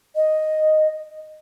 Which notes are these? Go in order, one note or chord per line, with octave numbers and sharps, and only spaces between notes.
D#5